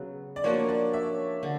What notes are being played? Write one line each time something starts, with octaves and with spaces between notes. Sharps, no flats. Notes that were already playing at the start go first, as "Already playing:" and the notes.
Already playing: C#3 F#3 B3
D5
F3 A#3 D4 F#4 C#5
D5
E5
D3